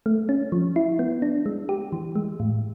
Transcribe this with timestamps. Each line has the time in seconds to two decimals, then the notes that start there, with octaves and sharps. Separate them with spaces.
0.06 A3
0.29 C#4
0.52 F3
0.76 E4
0.99 B3
1.22 D4
1.46 G#3
1.69 G4
1.92 E3
2.15 G#3
2.40 A2